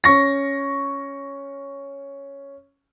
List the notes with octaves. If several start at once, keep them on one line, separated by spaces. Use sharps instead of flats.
C#4 C#6 A#6